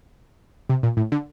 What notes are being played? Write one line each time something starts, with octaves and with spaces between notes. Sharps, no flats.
C3
A#2
A2
D3